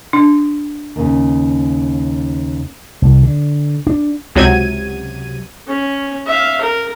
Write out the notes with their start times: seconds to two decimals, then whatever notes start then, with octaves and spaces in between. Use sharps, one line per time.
0.13 D4
0.96 D#2 C#3
3.02 C2
3.23 D3
3.87 D4
4.35 C#2 C3 F#3 G#6 D#7
5.67 C#4
6.26 E5 F5
6.61 A#4